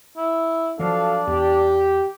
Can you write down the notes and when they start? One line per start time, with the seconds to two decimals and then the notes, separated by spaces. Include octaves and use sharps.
0.17 E4
0.79 F3 F#3 D4 F#4 A4 F5
1.27 E2 G4